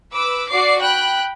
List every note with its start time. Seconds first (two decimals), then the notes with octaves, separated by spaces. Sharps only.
0.11 B4 D6 E6
0.49 F#4 D5 D6 C7
0.80 G5 B5 F#6